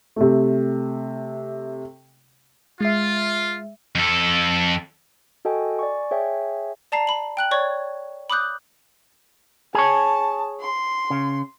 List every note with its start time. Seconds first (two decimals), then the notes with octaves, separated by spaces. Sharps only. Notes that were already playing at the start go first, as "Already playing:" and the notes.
0.16 C3 A3
2.81 G#3 F4 E5
3.96 F2 A4
5.45 F#4 A4 D#5 G5 G#5
5.79 D5 G#5 C#6
6.11 G#4 C#5 E5 G5 G#5
6.92 D5 A5 A#5 C7
7.07 B5 F#7
7.37 G5 F#6 F#7
7.51 C#5 D5 C#6 G#6
8.30 B5 D6 D#6 F#6 G6
9.75 G#4 C#5 A5
10.61 C6
11.10 C#3